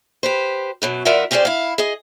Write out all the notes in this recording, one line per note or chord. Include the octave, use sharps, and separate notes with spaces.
G4 B4 C5
F#2 B2 F#3
E2 F4 A#4 D5 E5 F#5
C4 C#4 G4 G#4 C5 D5
E4 F5
G#4 D#5